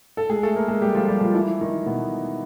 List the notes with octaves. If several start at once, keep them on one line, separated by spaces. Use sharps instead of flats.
A4
G#3 G#4
A3 A4
A#3 A#4
G#3 G#4
G3 G4
F3 F4
G3 G4
F3 F4
E3 E4
D#3 D#4
B2 B3